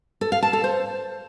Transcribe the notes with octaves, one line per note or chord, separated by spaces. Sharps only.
A4
F5
A5
A4
C5